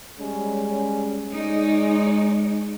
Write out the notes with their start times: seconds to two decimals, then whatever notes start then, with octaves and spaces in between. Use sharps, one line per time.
0.18 G3 G#3 C#4
1.33 G#3 D#4 C#5 D5